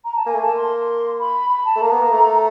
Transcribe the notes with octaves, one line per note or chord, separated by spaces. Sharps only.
A#5
A5
A#3 G#5
A3
A#3 A5
C6
B5
B5
A5
A3
A#3 A#5
B3
A#3
A3